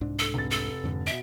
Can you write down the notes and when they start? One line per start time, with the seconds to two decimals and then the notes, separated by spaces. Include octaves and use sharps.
0.01 C2 G#2 D4
0.19 A4
0.34 F1 A6
0.51 A4
0.84 F2 G#2 D3
1.07 B2 E5 D7